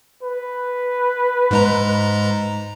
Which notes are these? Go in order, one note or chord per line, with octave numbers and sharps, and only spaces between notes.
B4
G#2 G#3 A#5